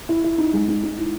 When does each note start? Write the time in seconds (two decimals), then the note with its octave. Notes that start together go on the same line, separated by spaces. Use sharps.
0.09 E4
0.24 E4
0.38 D#4
0.53 G#3
0.68 D#4
0.83 D#4
0.98 E4